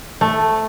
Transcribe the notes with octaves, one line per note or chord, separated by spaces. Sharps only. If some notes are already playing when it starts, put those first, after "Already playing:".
A3